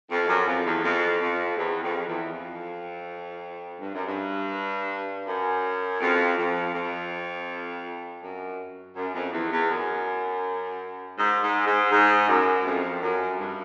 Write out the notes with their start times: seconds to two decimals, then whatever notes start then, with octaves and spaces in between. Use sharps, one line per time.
0.10 F2
0.28 F#2
0.47 F2
0.65 E2
0.84 F2
1.20 F2
1.57 E2
1.82 F2
2.06 E2
2.31 F2
3.79 G2
3.93 F#2
4.06 G2
5.26 F#2
6.00 F2
6.37 F2
6.74 F2
8.22 F#2
8.96 F#2
9.14 F2
9.33 E2
9.50 E2
9.69 F#2
11.17 G#2
11.41 G#2
11.66 G#2
11.91 G#2
12.27 F#2
12.65 F2
13.01 F#2
13.38 G2